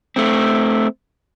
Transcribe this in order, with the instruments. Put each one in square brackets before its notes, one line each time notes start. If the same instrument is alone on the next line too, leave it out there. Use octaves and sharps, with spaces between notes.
[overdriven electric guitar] A3 C4